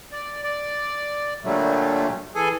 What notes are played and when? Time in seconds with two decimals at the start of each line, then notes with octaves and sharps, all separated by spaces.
0.12 D5
0.43 D5
1.44 A#2 D3 F#3 G3 A3
2.35 E3 G#4 A4 G#5